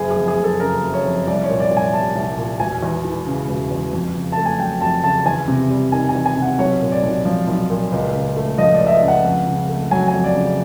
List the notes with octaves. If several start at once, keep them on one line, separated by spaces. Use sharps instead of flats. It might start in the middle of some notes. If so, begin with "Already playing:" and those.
Already playing: F#1 G#4
G#4
F2
G#4
F#1
A4
C#3 A#4
F#1
C#5
F2
C2 D5
C#5
A#2
D5
C2
G#5
G3 A5
C2
A#2
E1 G#5
E2
E3
C#3
E1
E2
F2
C#3
A3 A5
G#5
F#3 G5
F2 A5
C#3 A5
E2 G#5
C3
G3
D#3 G#5
G#5
E2
G#5
C3
F#5
B1 C#5
A#2
D5
B1
F3
B1
A#2
C#2
C#3
A3
F3 D#5
D5
C#2
E5
D#5
C#3
F#5
F2
C#3
A3
F#3 G#5
G#5
F2
D5
C#3